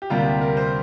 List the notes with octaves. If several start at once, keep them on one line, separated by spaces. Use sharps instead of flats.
G4
D2 C3 G3 A#3 F4
G4
A#4
C5